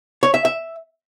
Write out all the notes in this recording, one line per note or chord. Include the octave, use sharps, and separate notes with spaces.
C#5
E5
E5